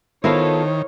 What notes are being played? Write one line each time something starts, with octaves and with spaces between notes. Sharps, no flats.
D#3 B3 E4 F4 A4 A#4 C5 C#5